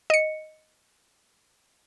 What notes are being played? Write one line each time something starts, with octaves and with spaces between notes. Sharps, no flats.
D#5 C#7